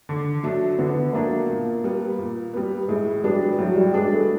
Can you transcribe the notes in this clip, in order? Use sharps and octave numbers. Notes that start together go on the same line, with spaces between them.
D3
F#3 A3 D4
D3 B3
F#3 A3 A#3 D4
A#2
G3 B3
A#2
G3 B3
A2 G#3
F#3 G3 B3 D4
A2 F#3
G3
F#3 G#3 B3 D4
A3